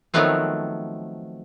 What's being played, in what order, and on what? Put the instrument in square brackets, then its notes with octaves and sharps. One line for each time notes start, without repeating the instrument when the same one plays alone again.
[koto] D#3 F3 F#3 A3 B3 C4